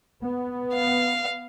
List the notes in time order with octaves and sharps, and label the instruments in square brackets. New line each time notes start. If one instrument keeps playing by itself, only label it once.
[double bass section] B3
[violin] F5